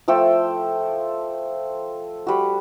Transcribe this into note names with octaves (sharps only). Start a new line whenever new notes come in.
F3 A3 A4 G5
G3 F#4